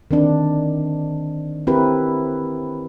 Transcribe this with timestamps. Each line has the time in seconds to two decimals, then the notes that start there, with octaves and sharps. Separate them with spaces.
0.11 D#3 C4 D4
1.67 C4 E4 G4 A#4 B4